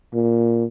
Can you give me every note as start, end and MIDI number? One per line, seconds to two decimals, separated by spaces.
0.14 0.64 46